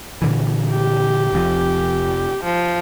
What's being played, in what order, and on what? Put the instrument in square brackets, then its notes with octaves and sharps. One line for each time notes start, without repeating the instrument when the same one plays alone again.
[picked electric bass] A#2 D3 E3
[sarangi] G4
[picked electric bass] F1 F2 F3
[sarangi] F3